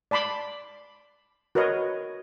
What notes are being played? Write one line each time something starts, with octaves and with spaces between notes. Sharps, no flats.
D5 A5 B5 C6 D6
F#4 A#4 B4 C#5 D#5